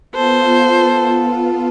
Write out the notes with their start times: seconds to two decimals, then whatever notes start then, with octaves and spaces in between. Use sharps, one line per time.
0.15 B3 F4 A4 C5